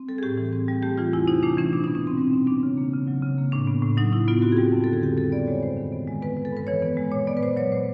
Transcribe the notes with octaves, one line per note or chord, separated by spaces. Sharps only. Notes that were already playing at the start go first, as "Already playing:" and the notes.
Already playing: C4
G3 A4
G#4
A2 G4
E3
C4
G3
A3 G4
E3 F4
E2 E4
C3 D#4
A3 D4
E3 C#4
B2 D4
D#4
B3
C#4
B2 C4
G3 C4
B2 C#4
B3 D4
C#3
A#3
C#3
F#3
C#3
A#3
A2 D4
B3
A2
F#3 D#4
A2 E4
B3 F4
C4 F#4
G#4
G3 G4
F2
D3 A4
G#4
C4 G4
G3 A4
B3 D5
G#3 C#5
G2 C5
D#3
B3
G#3
B3 B4
G#3
A4
G2 B4
E3 C#5
B3
G#3
A#2 C#5
B3 D5
B4
A#2 C5
F#3 C#5
A#2 C5